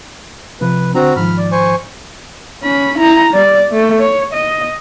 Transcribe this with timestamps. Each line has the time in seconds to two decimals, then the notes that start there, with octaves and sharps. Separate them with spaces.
0.61 C3 F3 B4
0.95 D3 C4 D4 F#4 A#5
1.16 G#2 D#3 F3 B5 F6
1.38 D5
1.52 C5 G#5 C#6
2.63 C#4 B5
2.98 E4 A#5
3.33 G3 D5
3.70 A3
3.99 C#5
4.33 D#5